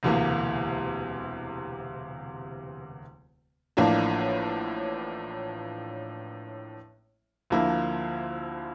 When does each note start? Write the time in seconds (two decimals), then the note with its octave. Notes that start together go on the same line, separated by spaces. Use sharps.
0.03 E1 D2 C3 E3 A#3
3.77 A1 A2 F3 A#3 D4
7.50 D2 D3 F3 A#3 E4